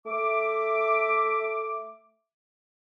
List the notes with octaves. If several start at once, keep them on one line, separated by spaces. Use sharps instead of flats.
A3 E5 D6